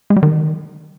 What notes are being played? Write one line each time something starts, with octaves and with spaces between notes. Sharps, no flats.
G#3
G3
D#3